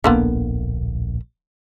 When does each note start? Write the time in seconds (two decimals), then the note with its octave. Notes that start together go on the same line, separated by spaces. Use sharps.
0.04 D1 A#1 D3 A#3 B3